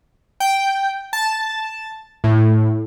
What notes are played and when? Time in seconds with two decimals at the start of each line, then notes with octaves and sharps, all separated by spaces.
0.40 G5
1.13 A5
2.24 A2